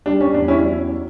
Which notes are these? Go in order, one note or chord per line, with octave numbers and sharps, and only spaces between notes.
G3 D4
C#4
E2 D4
C#4 E4
F#3